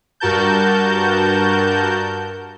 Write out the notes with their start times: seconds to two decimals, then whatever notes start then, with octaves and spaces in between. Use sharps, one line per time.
0.20 G2 F#4 A#4 A5 G6